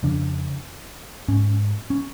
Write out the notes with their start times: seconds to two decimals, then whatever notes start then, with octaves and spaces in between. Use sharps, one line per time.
0.03 F2 C#3 D4
1.28 G#2 C#4
1.90 C#4